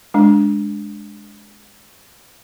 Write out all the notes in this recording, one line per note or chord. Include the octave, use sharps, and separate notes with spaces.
G#3 D4